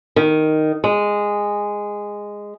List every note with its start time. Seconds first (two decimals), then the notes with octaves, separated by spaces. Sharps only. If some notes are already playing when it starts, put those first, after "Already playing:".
0.16 D#3
0.84 G#3